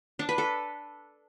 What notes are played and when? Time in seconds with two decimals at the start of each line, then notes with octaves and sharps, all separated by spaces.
0.19 D4
0.29 B4
0.38 A4